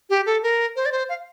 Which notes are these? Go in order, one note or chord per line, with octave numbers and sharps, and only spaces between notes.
G4
A4
A#4
C5
D5
C5
F5